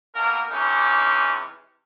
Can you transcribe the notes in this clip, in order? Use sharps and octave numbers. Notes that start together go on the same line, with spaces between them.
B2 A#3 A#4
C3 E3 G#3 C#4 D#4